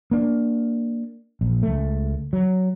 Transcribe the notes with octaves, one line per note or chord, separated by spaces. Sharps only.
A#3 D4
A#1
C#2 A3
F#3